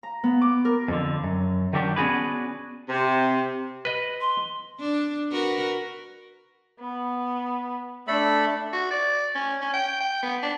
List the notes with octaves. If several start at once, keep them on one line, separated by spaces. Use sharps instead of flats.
A#5
B3
D6
A#4
F2 D3
F#2
D#3 F#3 G3 D4 G4
B3 C#4 D4 F#4 G#4 B4
C3
B4 D#5
C6
D4
F#4 A#4 B4
B3
A3 D4 A4 B5
F#4
D5
C#4
C#4
G5
G5
B3
D4